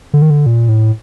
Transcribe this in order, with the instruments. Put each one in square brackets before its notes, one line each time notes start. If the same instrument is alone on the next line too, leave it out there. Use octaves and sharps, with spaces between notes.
[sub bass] D3
D#3
D3
A#2
A2